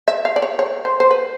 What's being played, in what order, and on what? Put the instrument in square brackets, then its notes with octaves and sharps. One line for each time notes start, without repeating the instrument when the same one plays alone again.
[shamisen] E5
F5
D5
C#5
C#5
C5
C5
B4